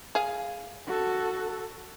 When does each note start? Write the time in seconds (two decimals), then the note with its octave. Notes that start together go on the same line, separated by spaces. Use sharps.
0.15 G#4 F5
0.87 F#4 A4